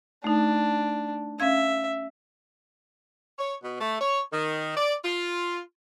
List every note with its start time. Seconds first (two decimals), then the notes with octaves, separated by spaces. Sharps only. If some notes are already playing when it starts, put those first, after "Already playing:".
0.24 A3 D4 D#4
1.40 C#4 E5 F5 G#6
3.39 C#5
3.63 B2
3.80 A3
4.01 C#5
4.32 D#3
4.77 D5
5.04 F4